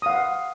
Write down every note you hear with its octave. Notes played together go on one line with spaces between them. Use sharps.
F5 F#5 D#6